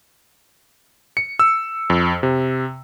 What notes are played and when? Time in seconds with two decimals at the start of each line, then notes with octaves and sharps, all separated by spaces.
1.17 C#7
1.39 E6
1.90 F2
2.23 C3